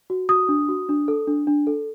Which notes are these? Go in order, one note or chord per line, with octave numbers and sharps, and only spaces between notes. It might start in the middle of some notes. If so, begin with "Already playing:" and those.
F#4
F#4 D#6
D4
F#4
D4
A4
D4
D4
A4